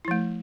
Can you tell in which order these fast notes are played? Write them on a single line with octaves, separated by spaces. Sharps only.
E4 F3 A3